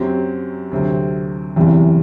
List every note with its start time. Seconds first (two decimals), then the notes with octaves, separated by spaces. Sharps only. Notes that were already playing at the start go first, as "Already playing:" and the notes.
Already playing: F#2 F#3 C4 G4
0.71 D2 C3 F#3 C4
1.56 F#1 E2 C3 E3